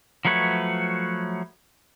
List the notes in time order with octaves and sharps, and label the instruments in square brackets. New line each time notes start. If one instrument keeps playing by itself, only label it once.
[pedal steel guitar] F3 F#3 A3 B4 C#5